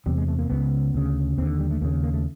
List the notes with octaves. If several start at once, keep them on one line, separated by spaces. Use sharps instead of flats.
E2 C3 G3
G#3
A3
A#3
C#2 C#3 B3
D2 C#3
D#2 D3 C4
G3
A3
D#2 C#3 A#3
A#3
A3